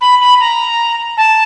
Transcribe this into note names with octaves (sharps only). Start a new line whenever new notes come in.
B5
B5
A#5
A5